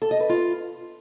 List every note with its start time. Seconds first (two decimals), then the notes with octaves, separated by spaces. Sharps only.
0.02 A4
0.11 D#5
0.20 B4
0.29 F4